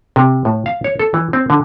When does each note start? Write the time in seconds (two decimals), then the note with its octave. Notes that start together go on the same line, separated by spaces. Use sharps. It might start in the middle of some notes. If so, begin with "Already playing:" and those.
0.16 C3
0.45 A2
0.66 F5
0.84 C#5
0.99 A4
1.14 E3
1.33 C4
1.50 D3